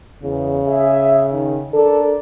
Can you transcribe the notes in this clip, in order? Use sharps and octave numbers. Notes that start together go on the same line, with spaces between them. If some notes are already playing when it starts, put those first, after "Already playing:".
E2 C#3
G#4 E5
D#3
D4 A4 A#4 D5